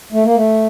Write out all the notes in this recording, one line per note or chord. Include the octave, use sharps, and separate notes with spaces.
A3
A#3
A3